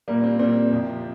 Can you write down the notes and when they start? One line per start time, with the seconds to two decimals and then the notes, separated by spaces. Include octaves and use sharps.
0.08 A#2 G3 A#3
0.24 C4
0.39 A#2 G3 C4
0.71 F2 C3 F3